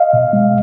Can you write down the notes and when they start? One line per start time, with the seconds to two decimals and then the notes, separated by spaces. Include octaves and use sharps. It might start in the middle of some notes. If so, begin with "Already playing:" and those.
Already playing: D#5 F5
0.13 B2
0.33 G#3